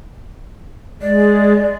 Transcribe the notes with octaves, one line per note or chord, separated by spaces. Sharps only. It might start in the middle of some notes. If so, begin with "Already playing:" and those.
G#3 D5